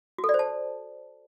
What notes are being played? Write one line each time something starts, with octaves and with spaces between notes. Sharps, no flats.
F#4
A4
D5
C5
A5